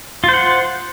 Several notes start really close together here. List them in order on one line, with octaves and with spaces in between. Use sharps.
F4 C5 F#5